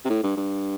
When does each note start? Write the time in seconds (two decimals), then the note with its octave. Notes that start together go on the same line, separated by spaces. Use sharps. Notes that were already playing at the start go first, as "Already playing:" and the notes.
0.05 C3
0.10 A2
0.23 G2
0.37 G2